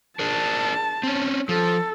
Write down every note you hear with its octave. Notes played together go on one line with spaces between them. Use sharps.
D4 G#4 A#4 A5
C4 C#4
F3 A4